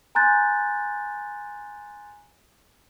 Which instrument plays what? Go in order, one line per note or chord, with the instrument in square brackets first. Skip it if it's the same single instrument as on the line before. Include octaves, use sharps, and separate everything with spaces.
[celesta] G#5 A#5 C6 F#6 G6 A6